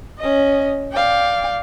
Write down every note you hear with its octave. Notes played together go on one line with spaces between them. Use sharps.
C#4 D#5
D5 F5 G5